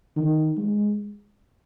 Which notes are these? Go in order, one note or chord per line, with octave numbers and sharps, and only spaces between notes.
D#3
G#3